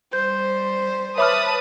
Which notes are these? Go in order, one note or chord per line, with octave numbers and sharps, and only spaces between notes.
G3 C5 G6
B4 C#5 E5 A5 B5 D6 D#6 F6